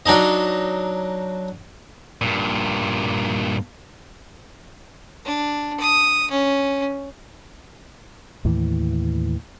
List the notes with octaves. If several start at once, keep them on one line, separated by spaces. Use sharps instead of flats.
F#3 D4 D#4 D#5
G2 A#2
D4
D#6
C#4
D#2 A2 E3